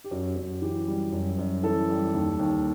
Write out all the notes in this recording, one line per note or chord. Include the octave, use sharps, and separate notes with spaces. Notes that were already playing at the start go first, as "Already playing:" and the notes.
G4
F#2 F#4
F#2
E3 G4
G3
F#2
F#2
E3 A4
G3
D#2
D#2